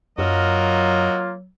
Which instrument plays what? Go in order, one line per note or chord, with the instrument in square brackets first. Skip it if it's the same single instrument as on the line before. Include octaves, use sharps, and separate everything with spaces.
[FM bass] F#2 [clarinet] F#3 [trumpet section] A#3 F4 [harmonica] F#4 A#4 D#5